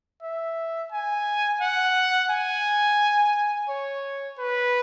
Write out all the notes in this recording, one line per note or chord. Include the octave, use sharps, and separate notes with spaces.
E5
G#5
F#5
G#5
C#5
B4